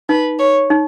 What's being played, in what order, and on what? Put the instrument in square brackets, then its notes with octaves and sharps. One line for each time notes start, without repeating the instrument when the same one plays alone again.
[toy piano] D#4 [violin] B4
[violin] C#5
[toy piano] D#4